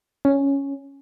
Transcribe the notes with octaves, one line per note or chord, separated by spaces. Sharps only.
C#4